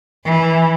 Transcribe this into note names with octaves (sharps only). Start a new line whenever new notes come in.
E3